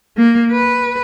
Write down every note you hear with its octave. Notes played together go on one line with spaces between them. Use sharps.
A#3
B4